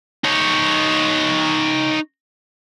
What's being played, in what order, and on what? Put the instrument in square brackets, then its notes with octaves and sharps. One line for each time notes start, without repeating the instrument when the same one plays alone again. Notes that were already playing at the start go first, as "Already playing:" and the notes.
[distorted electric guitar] D#4 C#5